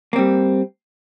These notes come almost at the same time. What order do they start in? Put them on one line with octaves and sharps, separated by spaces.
A#3 C4 G3